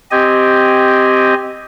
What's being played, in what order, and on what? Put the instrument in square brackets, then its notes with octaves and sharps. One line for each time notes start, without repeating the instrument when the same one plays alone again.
[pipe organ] C4 G4 D#5 G#5